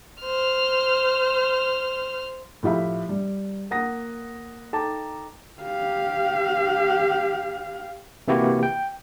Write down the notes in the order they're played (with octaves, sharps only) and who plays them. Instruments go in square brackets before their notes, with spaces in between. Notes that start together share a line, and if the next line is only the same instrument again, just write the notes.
[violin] C5 F6
[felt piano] A2 F3 G4 E5 F5 B5
G3
A#3 F#5 D#6 A#6
D#4 A4 G5 A5 A#5 D6
[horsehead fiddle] G4 F5
[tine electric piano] C3 E3 A#3 E4 F#4 G4
G5